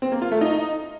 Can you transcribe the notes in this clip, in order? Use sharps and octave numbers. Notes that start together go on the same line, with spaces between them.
C4
A#3
F4
A3
D#4